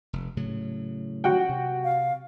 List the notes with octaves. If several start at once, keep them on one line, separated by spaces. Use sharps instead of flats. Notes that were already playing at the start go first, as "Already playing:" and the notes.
F1
A2 C#3 F#3
F#4 F#5 G5
C3
F5